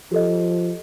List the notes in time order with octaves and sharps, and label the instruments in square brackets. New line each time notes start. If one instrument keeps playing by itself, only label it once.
[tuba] F3 [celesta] G4 A4 D#5